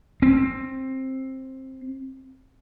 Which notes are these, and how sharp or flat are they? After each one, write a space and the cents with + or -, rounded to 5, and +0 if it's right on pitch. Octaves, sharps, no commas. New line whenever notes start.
C4 +15